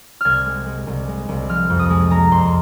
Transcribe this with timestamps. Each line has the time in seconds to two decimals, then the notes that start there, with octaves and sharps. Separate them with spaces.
0.21 C2 F6 G#6
0.46 G#3
0.66 G#3
0.87 C2
1.08 G#3
1.29 C2
1.49 F3 F6
1.70 F2
1.79 D#6
1.90 G#3
2.11 G#3 A#5
2.31 F2 C6